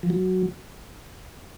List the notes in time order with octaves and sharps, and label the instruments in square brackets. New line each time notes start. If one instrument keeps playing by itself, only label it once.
[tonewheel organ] F3
F#3